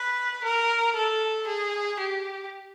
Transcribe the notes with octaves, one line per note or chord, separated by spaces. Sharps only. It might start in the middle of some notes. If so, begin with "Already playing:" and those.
Already playing: B4
A#4
A4
G#4
G4